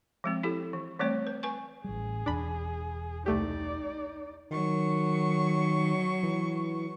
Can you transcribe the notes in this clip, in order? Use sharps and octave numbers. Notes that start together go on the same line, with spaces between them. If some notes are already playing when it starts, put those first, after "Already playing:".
F3 G#3 C4
E4 G4 A4
E3
E3 G3 A3 C4 C#5
B4
B4 G#5 C#6
A1 G3 G#4
E1 E2 D4 B5
C2 A3 D#4 G4 D5
D#3 F#3 C#6
E3